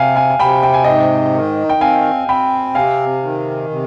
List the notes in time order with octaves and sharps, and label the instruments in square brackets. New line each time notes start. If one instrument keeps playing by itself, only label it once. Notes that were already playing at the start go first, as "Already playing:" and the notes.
Already playing: [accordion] C3 [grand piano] F5 G5 G#5
[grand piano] F5 G#5
G#5
[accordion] C3 [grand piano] G5 B5
[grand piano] G5
G#5
[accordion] G#2 [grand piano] D#5 G5
[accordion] D#3
[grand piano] G5
[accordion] C4 [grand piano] F5 G#5
[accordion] C4 [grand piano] G5 B5
[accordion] C3 [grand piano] F5 G#5
[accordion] D#3
C3